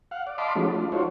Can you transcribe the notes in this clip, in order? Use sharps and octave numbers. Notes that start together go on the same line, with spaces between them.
F5 F#5
D5
D#5 F5 A5 B5 C6 D6
F3 G#3 A3 C#4 D#4 F#4
D4 F4
D#4 F4 F#4 A4 C5 C#5